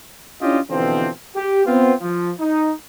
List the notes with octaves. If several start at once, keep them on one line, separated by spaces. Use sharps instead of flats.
C#4 D4 E4 F4 G4 D#5
B2 D3 E3 F3 C4
G4
B3 C4 F4
F3
D#4